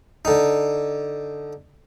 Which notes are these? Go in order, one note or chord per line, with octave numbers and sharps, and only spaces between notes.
D3 D#4